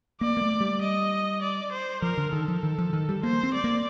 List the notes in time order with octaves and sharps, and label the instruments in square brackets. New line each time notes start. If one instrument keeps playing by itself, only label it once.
[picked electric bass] A#3 [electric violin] D5
[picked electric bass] A#3
A3
G3
[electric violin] D#5
D5
C5
[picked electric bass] F3 [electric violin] A#4
[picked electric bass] D3
[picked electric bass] D#3 [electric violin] A4
[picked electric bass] F3
D#3
F3
D#3
G3
[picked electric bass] A#3 [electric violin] C5
[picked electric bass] C4
[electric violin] D5
[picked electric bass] A#3